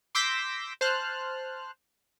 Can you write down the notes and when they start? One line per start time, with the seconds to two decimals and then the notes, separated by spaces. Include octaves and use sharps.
0.15 C6 D6 E6 G6 A#6 B6
0.81 C5 A5 F6 F#6